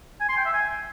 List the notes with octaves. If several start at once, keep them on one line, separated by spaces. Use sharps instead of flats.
G#5
C6
G5
E5
G#5